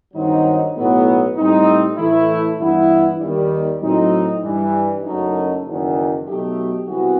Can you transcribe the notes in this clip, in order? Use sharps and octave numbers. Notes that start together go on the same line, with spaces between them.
G2 D#3 F#3 C4 D#4
B1 A2 F#3 B3
A2 G3 C4 D#4
A2 E3 A3 E4
G2 E3 B3 E4
D#2 D#3 G3
A2 F#3 C4 D#4
G2 E3 G3
F#1 F#2 F#3 A3 D#4
F#1 E2 D#3
B2 F#3 A3 D#4 G4
C2 C3 E3 B3 F#4